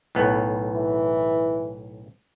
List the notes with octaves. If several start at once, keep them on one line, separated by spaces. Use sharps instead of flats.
B1 A2 B3
E3